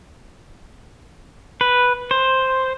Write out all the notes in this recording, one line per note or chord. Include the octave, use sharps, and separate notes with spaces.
B4
C5